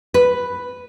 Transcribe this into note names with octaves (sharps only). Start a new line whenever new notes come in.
B4